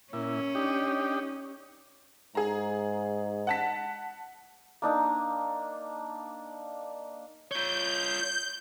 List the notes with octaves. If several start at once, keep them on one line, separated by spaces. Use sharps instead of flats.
A#2 C#4 E4
D4 D#4 G4
G#2 G#4 A#5
F#5 A5 B6
A#3 D4 D#4
F4 C#5 G6